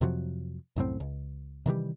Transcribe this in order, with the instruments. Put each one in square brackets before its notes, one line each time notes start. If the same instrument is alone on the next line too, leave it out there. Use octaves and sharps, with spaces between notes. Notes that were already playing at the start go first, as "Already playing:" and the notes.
[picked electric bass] F2 C3 F3 F#3
C2 F#2 A2 C4
C#2
C3 D#3 E3 G3